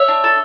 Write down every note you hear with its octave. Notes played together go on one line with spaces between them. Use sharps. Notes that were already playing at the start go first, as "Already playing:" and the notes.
Already playing: C#5 E5
D4
A4